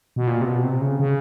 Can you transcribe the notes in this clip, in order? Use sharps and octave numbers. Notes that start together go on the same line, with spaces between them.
B2
A#2
C3
B2
C3
C#3
C#3